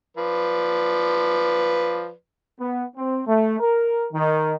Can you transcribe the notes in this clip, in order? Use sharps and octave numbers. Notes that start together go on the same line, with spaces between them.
F3 B4 D5
B3
C4
A3
A#4
D#3